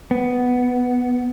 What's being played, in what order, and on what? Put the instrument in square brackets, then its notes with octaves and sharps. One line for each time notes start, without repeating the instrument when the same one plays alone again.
[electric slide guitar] B3